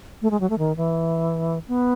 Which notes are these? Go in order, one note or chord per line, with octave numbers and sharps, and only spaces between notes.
A3
G#3
F#3
A3
D#3
E3
B3